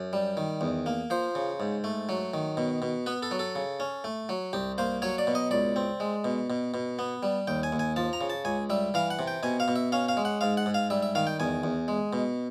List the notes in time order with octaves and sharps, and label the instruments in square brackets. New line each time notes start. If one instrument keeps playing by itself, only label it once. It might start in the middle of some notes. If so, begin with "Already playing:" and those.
Already playing: [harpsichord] F#2
G3
D#3
E2
A#3
F3 C5
C#3
G#2
A3
F#3
D#3
B2
B2
B3 B4
A4
F#3
A4
C#3
C#4
A3
F#3
C2 G4
A#3 C5
F#3 C#5
D5
B2
D#5
C#2 D5
C4
G#3
B2
B2
B2
B3
G3
D#2 G5
G#5
D#2
G#5
F3 A5
A#5
C#3
A5
C#2 G#5
G3 E5
E3 F5
F#5
C3
G5
B2 G#5
F5
B2
E5
C#4 F5
F5
G#3
F#5
G#2 F5
F#5
G#2
F5
G3 E5
E5
D#3 F5
G5
E2 G#5
E2
G#3
B2